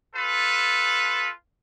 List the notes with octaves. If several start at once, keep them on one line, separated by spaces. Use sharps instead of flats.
F4 A4 B4